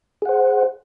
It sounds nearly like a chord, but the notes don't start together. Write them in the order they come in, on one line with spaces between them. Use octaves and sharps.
G#4 F#5 C5